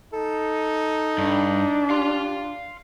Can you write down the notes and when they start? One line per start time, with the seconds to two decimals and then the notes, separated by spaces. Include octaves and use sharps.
0.13 D#4 A4
1.18 G2 D4
1.90 G4 F5 C6